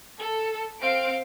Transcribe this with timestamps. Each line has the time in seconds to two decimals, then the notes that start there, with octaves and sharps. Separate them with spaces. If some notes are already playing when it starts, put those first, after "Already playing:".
0.18 A4
0.81 C4 F5 D7